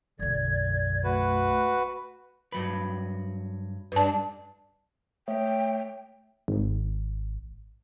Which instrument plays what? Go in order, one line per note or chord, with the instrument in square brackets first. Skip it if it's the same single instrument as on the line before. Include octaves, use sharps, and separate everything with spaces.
[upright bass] B1 F#2 [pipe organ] D3 D5 G#6
[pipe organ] A3 [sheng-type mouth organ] F#4 B4
[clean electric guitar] G2 F#3 B4
[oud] G2 D4 [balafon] B4 A5
[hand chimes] A3 C#5 E5 [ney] G5
[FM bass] G#1